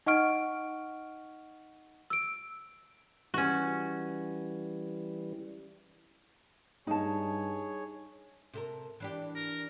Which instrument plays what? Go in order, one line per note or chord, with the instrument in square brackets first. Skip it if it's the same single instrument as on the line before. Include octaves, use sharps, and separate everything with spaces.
[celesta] D#4 D#5 F#5 C#6 F6 D7
E6 D7
[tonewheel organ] E3 G3 [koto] C#4 F#4
[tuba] G2 [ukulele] D#4 A5 [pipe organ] G#4 C#5
[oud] C3 A4 A#4
E3 D4 G4
[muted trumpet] A#4